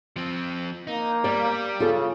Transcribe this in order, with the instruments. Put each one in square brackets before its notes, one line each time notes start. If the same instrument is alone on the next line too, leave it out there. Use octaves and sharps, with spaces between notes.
[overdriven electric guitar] F3 C4
[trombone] A#3 [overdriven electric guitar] D#4
[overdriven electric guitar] G3 [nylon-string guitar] D5
[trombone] C#3 [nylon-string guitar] F4 A4